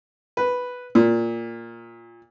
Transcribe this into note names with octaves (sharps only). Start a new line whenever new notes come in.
B4
A#2